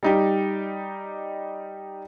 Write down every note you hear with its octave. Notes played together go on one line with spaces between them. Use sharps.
G3 D#4 G4